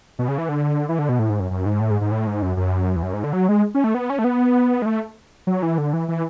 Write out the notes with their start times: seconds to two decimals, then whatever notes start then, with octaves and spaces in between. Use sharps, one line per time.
0.19 B2
0.28 C#3
0.38 E3
0.49 D3
0.89 E3
0.99 D3
1.09 B2
1.19 A2
1.30 G#2
1.40 F#2
1.51 F#2
1.66 G#2
1.80 A2
1.91 G#2
2.01 G#2
2.11 A2
2.27 G#2
2.42 F#2
2.57 F#2
2.96 E2
3.03 F#2
3.13 G#2
3.24 D3
3.33 F#3
3.49 G#3
3.75 C#4
3.84 A3
3.94 B3
4.10 C#4
4.19 A3
4.24 B3
4.82 G#3
4.86 A3
5.47 F#3
5.62 E3
5.78 D3
5.93 E3
6.09 E3